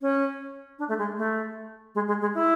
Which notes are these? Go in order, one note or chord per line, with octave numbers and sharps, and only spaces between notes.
C#4
D4
A3
G#3
A3
G#3
G#3
G#3
E4